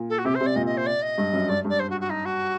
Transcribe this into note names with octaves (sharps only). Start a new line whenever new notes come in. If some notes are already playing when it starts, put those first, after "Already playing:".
Already playing: A#2
A4
F#4
C3 G4
C5
C3
D5
A#2 D#5
D#5
C5
D5
D#5
G2
F#2
G2 D5
G2 D5
C5
F#4
F#4
D#4
F#4